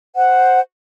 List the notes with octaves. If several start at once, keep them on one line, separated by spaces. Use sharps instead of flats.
C5 F#5